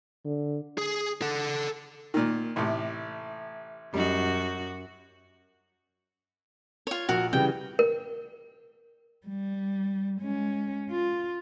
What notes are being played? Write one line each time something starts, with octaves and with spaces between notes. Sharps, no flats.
D3
G#4
A4 F#5
A#2 D#3
A1 A2 C3
F#2 G3 D#4 F#4
F4 C#5
A#1 F#4 A#4
C#3 E3 G3 G5
A#4
G3
G#3 C#4
F4